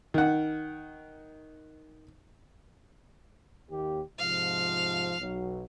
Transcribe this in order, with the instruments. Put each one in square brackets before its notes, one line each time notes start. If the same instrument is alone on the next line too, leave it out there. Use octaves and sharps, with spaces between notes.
[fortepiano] D#3 F#5
[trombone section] D#2 G4
[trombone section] G#2 C3 F3 [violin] F5
[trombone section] B1 F#3